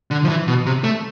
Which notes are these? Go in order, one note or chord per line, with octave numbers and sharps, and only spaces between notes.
D3
F3
E3
B2
C3
A3